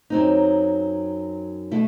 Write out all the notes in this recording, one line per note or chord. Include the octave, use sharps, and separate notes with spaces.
F#2 F#3 C4 D#4
B2 A3 E4